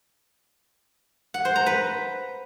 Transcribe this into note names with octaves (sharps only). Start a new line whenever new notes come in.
F#5
C5
A#5
B4